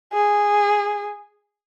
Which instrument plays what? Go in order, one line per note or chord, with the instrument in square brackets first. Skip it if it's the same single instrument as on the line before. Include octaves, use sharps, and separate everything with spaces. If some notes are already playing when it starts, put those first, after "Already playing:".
[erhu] G#4